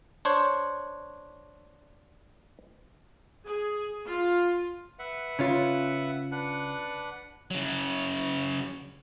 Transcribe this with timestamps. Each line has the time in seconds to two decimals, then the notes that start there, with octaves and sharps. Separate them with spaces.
0.25 D4 C5 C#5
3.45 G#4
4.06 F4
4.99 B4 E5 F#5
5.39 C#3 C#4 F4
6.32 D4 B4 F#5
7.51 C#3 F#3